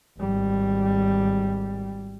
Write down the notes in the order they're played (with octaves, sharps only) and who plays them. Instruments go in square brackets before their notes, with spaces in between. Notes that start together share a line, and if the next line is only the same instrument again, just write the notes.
[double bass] G#1 G3